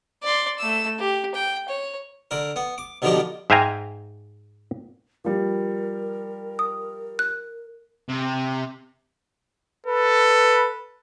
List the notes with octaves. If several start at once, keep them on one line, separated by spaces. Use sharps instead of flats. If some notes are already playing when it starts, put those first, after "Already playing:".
D5 C6
A3 E6
G4
G5
C#5
D3 A#4
B3
D6
B2 D3 D#3 F3 A#3 G4
G#2 E5 F5 G5 G#5 A#5
F3 G3 A#4
D#6
F#6
C3
A4 B4